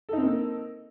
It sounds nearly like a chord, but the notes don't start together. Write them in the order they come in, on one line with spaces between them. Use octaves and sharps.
A4 D#4 C4 A#3